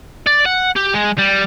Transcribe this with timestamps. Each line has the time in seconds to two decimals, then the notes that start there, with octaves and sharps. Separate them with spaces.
0.27 D5
0.46 F#5
0.76 G4
0.94 G#3
1.19 G3